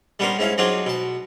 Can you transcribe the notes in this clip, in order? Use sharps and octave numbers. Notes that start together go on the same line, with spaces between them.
G3 B3 C#4 D4 A#4 C5
G#2 C#4 E4 F5
F#3 C4 D4 D#4 F4 G#4
B2 A5